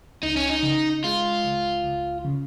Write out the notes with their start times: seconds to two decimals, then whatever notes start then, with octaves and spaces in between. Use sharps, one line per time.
0.23 C#2 D#4
0.36 C#4
0.50 D#4
0.63 C#3
1.04 G#3 F4
1.45 C#2
1.84 C#2
2.25 C#3